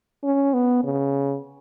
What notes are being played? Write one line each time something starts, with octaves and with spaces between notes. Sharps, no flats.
C#4
B3
C#3